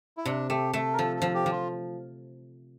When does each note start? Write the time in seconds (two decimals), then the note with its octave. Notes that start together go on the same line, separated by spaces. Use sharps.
0.17 E4
0.25 C3 D4
0.49 A3 G4
0.73 A3 A4
0.93 A#4
0.99 F3 A4
1.16 A4
1.22 F3
1.34 G4
1.46 F3
1.52 F4